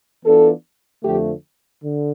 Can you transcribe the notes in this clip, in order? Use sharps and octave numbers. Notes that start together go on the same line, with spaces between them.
E3 B3 D4 F4 A4
F2 D3 F3 A3 G4
D3